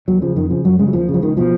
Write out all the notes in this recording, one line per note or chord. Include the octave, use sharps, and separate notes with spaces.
D#2 F#3
C#3 F3
F2 D#3
C#3 F3
F#2 F#3
C#3 G#3
F#3
D#2 F3
C#3
F3
C#2 D#3
B2 F3